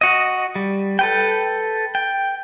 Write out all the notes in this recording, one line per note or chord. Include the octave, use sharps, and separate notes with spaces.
F#4 D#5
G3
A4 B4 G5
G5